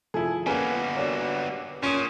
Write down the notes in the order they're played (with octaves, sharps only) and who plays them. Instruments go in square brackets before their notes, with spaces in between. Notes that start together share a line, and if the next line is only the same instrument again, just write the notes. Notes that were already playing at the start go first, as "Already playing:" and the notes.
[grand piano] F3 A4 [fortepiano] E4 G#4
[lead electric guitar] G3 B3 [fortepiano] A#3 C#4 [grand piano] B4 G#5
[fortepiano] A#3 D4 F#4 [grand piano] C#5
[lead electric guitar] A#2 [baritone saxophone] C#4 [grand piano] C6 D#6